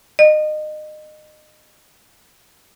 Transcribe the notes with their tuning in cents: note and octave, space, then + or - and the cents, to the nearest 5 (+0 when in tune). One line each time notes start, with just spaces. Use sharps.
D#5 -25